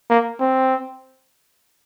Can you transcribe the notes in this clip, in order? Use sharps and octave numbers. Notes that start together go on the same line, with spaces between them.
A#3
C4